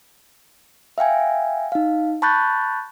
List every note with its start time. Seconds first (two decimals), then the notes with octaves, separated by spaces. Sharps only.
0.98 E5 F5 G5 G#5
1.72 D#4 F5
2.22 A5 B5 C#6 F#6 G6 A6